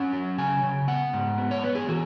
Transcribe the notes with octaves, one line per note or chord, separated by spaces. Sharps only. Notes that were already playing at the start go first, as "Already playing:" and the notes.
Already playing: C#4 F#5
F#3
C#3 G#5
C#3
B3 F#5
G#2
B3
C#5
B3 B4
G#4
E3 F#4